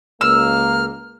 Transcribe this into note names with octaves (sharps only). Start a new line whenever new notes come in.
C#2 A#3 E6 F6